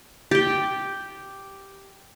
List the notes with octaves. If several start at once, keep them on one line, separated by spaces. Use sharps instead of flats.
G4 G5